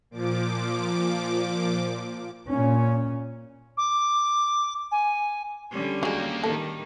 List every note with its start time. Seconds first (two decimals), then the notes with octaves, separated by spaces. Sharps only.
0.11 A#2 F3 D6
2.51 A#2 C#4
3.77 D6
4.92 G#5
5.71 D3 G3 C#4
6.03 F#3 G#3 A#3 G4
6.44 D#3 G3 A4